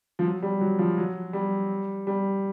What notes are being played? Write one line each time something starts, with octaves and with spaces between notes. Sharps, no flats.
F3
F#3
G3
F#3
F3
F#3
G3
G3